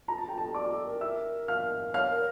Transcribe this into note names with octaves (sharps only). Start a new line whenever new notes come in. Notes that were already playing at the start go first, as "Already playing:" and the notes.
F4 A#5
A5
F4 G5
F4 A4 A5
F4 D5 D6
A4
A#4
E5 E6
F5 F6
C#5 F5 F6
A#4